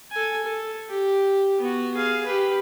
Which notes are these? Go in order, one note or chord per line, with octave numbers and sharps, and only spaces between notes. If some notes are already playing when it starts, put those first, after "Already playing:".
A4 G#5
A4
G4
B3 F#4
G#4 F5
G4 B4